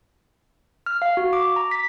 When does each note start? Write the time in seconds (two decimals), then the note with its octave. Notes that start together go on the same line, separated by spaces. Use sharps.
0.86 F6
1.02 F5
1.17 F#4
1.33 D6
1.56 A#5
1.71 B6